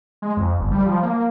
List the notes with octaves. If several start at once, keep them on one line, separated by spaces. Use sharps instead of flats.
G#3
F2
G1
G3
F3
A#3